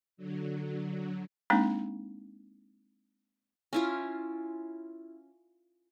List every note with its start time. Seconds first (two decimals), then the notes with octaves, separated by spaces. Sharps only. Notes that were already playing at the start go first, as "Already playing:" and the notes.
0.17 D3 F#3
1.50 G#3 A#3 C4 D4 D#4
3.73 C#4 E4 F4